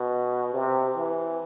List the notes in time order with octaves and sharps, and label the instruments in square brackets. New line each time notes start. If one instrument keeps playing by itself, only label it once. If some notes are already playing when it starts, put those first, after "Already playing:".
Already playing: [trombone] B2
C3
E3